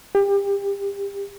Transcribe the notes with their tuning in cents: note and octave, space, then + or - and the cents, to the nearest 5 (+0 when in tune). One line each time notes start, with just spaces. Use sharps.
G4 +30